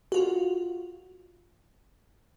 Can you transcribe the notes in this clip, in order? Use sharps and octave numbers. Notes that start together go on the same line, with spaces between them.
F4 F#4